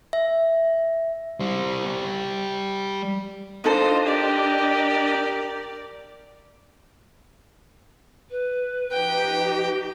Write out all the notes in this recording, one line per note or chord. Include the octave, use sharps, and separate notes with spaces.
E5
G3 C5
D4 D#4 F4 A4 C5 D#5
G4 A#4 D5
B4
F3 D#4 G4 G5